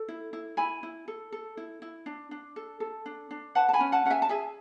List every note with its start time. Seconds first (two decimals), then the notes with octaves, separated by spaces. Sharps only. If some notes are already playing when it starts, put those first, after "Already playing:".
Already playing: A4
0.08 E4
0.33 E4
0.57 E4 G#5 B5
0.83 E4
1.08 A4
1.32 A4
1.57 E4
1.82 E4
2.06 D4
2.31 D4
2.56 A4
2.80 A4
3.06 D4
3.31 D4
3.55 B4 F#5 A5
3.69 A5
3.73 G#5 B5
3.80 C#4
3.92 F#5 A5
4.05 C#4 F#5
4.10 E5 G#5
4.22 A5
4.29 G#4 E5 G#5